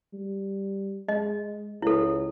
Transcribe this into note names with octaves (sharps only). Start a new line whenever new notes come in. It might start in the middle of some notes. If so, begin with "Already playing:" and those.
G3
G#3 D#5
C#2 E4 A4